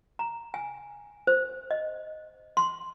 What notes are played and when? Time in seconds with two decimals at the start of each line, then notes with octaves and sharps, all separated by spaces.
0.19 A#5
0.54 G#5
1.27 C5
1.71 D#5
2.57 C6